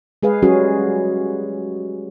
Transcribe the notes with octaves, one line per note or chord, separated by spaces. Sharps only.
G#3 G#4 B4 F5
F#3 G3 C#4 F#4 G#4